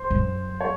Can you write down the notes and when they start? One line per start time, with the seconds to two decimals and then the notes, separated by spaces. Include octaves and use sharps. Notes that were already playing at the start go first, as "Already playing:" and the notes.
Already playing: C5
0.10 F#2
0.61 C#5